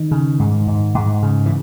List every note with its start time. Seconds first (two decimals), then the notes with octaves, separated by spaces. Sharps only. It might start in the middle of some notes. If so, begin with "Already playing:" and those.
Already playing: D#3
0.11 C#3
0.40 G#2
0.67 G#2
0.95 G#2
1.23 C#3
1.46 E3